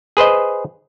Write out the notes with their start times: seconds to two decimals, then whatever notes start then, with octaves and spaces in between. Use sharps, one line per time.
0.17 G#4 B4 C5 D#5